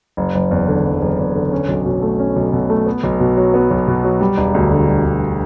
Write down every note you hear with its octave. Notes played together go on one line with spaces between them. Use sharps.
F#1
F#1
E2
D3
F#1
F#1
E2
D3
C#4
B1
B2
A3
C#4
B1
B2
A3
B3
B1
B2
F#3
B3
B1
B2
F#3
G3
E1
D2
D3
G3
E1